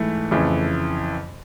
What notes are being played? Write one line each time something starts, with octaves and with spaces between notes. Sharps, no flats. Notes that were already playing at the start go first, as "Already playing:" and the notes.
Already playing: G#2 E3 A3
F2 C#3 E3